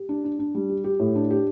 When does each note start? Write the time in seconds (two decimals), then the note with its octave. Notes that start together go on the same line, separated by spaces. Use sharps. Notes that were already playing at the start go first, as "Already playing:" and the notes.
Already playing: G4
0.09 D4
0.24 D4
0.39 D4
0.55 G3
0.69 G4
0.84 G4
0.99 A2
1.16 D4
1.30 G4